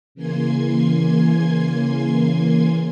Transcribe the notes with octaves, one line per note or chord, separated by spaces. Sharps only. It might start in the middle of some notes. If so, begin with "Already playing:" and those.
C#3 E3 A#3 G#5 C6 G#6